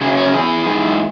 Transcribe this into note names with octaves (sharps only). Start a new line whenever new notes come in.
F#2 C#3 F#3 G#4
C#5
C#4
E2 E3 G#4
G#2 E3